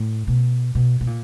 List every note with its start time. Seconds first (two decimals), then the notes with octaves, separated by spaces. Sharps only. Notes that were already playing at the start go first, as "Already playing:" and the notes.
Already playing: A2
0.27 B2
0.75 B2
1.01 B2
1.07 A#2